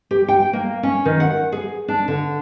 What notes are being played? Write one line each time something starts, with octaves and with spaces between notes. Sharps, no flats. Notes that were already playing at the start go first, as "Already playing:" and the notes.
G4
G5
A#3
C#4
D#3
F#5
G#4
D4
D3